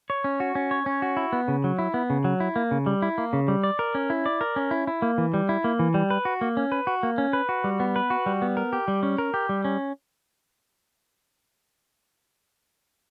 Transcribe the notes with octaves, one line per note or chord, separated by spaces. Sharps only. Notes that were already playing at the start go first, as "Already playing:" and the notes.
C#5
C#4
F#4
C#4
C#5
C#4
F#4
E4
B3
C#3
F#3
E4
B3
C#3
F#3
E4
A#3
C#3
G3
E4
A#3
C#3
G3
D5
A#4
C#4
E4
D5
A#4
C#4
E4
E4
A#3
E3
G3
E4
A#3
E3
G3
B4
F#4
A#3
C#4
B4
F#4
A#3
C#4
B4
F#4
G3
B3
B4
F#4
G3
B3
A#4
G4
G3
C#4
A#4
G4
G3
C#4